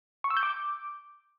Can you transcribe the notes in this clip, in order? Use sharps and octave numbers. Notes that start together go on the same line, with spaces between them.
C#6
E6
G6
D6